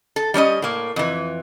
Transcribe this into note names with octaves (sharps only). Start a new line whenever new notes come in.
A4
G3 C#4 D4 D#5
A2 A#3
F2 E3